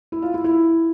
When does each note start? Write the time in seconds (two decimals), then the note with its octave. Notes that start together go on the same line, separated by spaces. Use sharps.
0.12 E4
0.22 F4
0.34 E4
0.44 E4